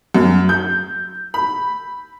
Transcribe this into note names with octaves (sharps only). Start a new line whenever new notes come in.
F#2
G6
B5